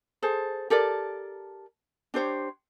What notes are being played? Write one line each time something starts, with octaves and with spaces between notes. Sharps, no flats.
G#4 A4 C5
G4 A4 A#4 D5
D4 G4 C5 C#5